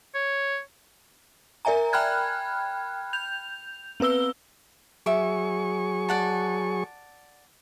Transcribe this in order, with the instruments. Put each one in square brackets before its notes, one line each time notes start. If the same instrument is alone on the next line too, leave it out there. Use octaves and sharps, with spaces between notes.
[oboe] C#5
[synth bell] A#4 D5 E5 G#5 A#5
G5 B5 F6 F#6 G#6
G6 F7
B3 C4 B4 E6 G7
[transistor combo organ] F#3 G#4 C#6 [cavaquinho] E5 D6
[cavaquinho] D5 F#5 A5